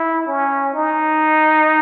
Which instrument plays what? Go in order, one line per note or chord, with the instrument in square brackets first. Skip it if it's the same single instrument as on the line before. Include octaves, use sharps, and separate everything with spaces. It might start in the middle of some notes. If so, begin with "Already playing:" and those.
Already playing: [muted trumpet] E4
C#4
D#4